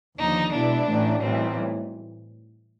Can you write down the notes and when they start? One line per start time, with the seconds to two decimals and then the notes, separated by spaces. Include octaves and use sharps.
0.18 D#2 D3 F3 D#4
0.53 B2 G#3 B3 D4 E4
0.88 A1 A2 E3 A3
1.22 B1 A2 E3 G3 C4